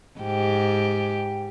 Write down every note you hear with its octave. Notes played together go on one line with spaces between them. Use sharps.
G#2 G4